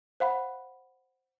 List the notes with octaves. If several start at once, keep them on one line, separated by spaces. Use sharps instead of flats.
C5 F5 F#5 B5